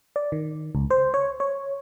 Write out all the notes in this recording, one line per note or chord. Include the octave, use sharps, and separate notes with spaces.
D5
D#3
C#2
C5
C#5
C#5